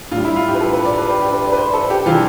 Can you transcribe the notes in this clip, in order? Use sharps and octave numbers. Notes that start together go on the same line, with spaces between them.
A2 G3 F4
E4
F4
G4
B4
A4
B4
D5
B4
G4
G4
B4
D5
B4
C5
A4
G4
C3 E3 G3 F4